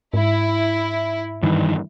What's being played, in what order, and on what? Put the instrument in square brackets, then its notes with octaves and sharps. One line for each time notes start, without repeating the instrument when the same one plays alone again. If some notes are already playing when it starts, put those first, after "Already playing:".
[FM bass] G#2 [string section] E4
[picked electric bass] G2 D#3 E3